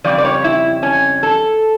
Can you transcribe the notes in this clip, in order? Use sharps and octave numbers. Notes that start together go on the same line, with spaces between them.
F2 C#3 G3 D5
D5
C#5
E4
C#4
A4